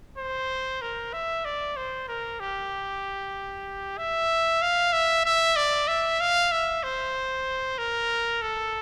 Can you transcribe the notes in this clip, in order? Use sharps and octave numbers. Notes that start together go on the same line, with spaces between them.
C5
A#4
E5
D5
C5
A#4
G4
E5
F5
E5
E5
D5
E5
F5
E5
C5
A#4
A4